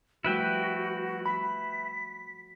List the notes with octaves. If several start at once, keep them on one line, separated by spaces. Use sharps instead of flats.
F3 G3 A3 E4 F#4 B4 G5
F#4 B5 B6